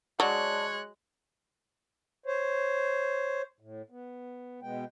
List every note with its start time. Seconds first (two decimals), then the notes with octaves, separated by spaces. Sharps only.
0.20 F#3 G#3 C#5 D5 A5 F#6
2.26 C5 C#5
3.60 A2
3.90 B3
4.62 B2 G#3 B3 G5